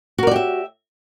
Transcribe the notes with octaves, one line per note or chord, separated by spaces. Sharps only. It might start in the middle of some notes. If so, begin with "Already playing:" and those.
F#4 G4 A#4 D5 E5